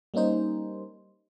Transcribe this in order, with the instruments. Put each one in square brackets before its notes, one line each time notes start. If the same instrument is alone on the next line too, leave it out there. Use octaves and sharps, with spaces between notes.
[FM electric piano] G3 A#3 C#4 D#4 C5